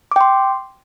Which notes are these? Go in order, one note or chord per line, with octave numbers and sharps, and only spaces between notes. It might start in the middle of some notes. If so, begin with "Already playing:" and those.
G5 C6 D6